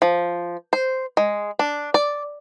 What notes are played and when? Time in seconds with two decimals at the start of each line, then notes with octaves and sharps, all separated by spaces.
0.02 F3
0.73 C5
1.17 G#3
1.59 D4
1.94 D5